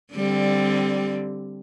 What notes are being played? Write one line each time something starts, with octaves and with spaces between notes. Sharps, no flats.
D3 G3 C4